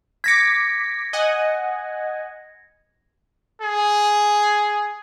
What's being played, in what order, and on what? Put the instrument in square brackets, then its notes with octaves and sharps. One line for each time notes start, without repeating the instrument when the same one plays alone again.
[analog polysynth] D6 B6 [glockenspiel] G#6 A#6 C#7
[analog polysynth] D#5 F#5 G#5
[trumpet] G#4